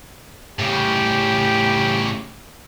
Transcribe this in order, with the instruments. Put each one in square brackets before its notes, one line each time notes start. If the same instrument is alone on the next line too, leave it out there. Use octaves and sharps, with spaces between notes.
[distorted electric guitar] A2 C#3 [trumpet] G4